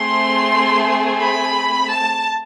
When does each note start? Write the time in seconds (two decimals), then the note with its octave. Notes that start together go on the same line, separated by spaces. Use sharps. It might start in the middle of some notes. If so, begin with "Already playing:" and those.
Already playing: A3 C4 G#4 C6
1.20 B5
1.88 A5